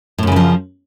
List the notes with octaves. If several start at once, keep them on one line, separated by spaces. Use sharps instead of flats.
F#2 A2 C#3 E3 F3